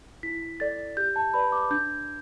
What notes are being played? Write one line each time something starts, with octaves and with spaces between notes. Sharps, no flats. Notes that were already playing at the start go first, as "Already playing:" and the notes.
E4 B6
A4 D5 A6
G4 G6
A5
B4 D5 B5
D6
D4 G6